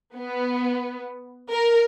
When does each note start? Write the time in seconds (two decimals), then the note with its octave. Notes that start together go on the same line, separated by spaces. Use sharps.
0.17 B3
1.51 A#4